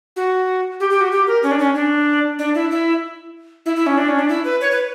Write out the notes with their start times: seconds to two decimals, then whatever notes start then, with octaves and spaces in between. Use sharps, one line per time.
0.16 F#4
0.80 G4
0.90 G4
1.01 F#4
1.11 G4
1.27 A#4
1.43 C#4
1.51 D4
1.59 C#4
1.75 D4
2.39 D4
2.55 E4
2.71 E4
3.66 E4
3.76 E4
3.87 C#4
3.97 D4
4.08 C#4
4.19 D4
4.29 E4
4.45 B4
4.61 C#5
4.71 B4